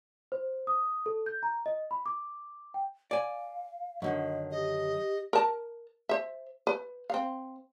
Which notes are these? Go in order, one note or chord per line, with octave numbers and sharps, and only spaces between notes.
C5
D#6
A4
G6
A#5
D#5
B5
D6
G5
D5 F5 G#5
F#2 D3 D#3 D#5
G4 D#5
A#4 A5
C5 E5
B4
C4 F5